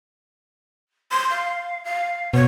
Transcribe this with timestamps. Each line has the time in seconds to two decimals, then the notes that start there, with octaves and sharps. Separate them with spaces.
1.12 C6
1.30 F5
1.84 F5
2.34 B2 C#5